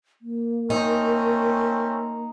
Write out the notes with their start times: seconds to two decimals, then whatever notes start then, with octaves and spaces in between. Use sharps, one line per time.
0.22 A#3
0.70 A3 C4 C#4 D#4